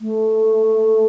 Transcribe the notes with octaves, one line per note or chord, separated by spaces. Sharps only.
A3